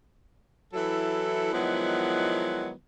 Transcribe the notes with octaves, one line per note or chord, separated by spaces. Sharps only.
E3 F#3 E4 A4
D#3 F3 F#3 G#3 B3 E4